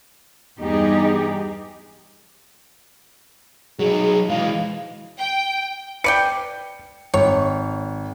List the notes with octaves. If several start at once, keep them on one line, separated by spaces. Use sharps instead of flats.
E2 G2 G3 D#4 G4 G#4
F#3 D#4 G#4
E3 G#3 F5
G5
B4 D5 G5 C#7
G#1 C#5